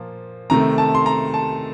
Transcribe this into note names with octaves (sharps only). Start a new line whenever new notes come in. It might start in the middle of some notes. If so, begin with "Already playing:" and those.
Already playing: A#2 F3 A#3
C3 D#3 A3 A#5
A5
C6
A#5
A5